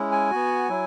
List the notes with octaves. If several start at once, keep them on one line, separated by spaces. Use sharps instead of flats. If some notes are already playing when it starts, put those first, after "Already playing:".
Already playing: G#3 C#4 E4
G#5
B3 F#4
F#3 E4